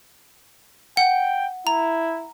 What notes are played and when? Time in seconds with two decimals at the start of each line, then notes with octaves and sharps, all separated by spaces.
0.97 F#5 G5
1.67 E4 A#5